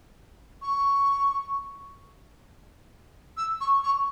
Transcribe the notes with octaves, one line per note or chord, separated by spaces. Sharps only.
C#6
E6
C#6
C#6